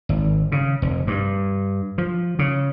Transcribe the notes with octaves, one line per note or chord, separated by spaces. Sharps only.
G#1
C#3
F1
G2
F3
C#3